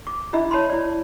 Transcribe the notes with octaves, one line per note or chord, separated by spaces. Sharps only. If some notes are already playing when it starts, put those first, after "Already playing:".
D6
D4 E4 D#5 E5 B5
C#5 A5 B5 C6
E4 D5